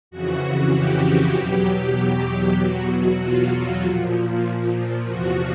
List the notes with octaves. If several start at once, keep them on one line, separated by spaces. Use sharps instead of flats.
F2 C#3 E3 F#4
G4
E2 B2 F#3 G4
E2 B2 F#3 F#4
F4
A#2 F3
E2 C3 F3 F#4